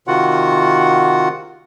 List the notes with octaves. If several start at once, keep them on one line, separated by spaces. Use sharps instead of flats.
C3 D#3 F4 F#4 F#5